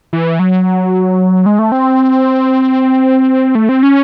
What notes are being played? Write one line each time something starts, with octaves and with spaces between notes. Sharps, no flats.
E3
F#3
G#3
A3
C4
A3
C4
C#4